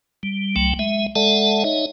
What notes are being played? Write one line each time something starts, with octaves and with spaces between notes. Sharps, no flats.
G3
C2 F#3 A3 G5
G#3 E5
G#3 A4 D5 E5 F#5 A5
D#4 C#5 D#5 E5